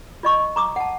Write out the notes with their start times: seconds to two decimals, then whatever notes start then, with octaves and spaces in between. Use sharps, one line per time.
0.23 F4 D#5 C#6
0.56 A#5 D6 D#6
0.76 F#5 A5